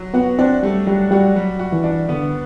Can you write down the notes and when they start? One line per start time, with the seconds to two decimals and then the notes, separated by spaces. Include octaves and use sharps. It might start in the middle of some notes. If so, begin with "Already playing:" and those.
Already playing: F#3
0.14 B3 F#4
0.39 C4 D4
0.63 G3 A3
0.87 F#3 G3
1.11 G3 F#4
1.36 F#3 G3
1.59 F#4
1.72 E3
1.84 D4
2.09 D3 B3